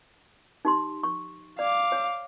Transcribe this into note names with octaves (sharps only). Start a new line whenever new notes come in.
D#4 G4 C6
C#6
D5 F5 D6
C#5